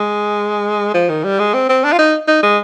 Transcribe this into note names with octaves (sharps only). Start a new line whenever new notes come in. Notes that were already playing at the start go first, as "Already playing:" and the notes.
Already playing: G#3
F3
D#3
G3
G#3
C4
C4
D4
F4
D#4
D#4
G#3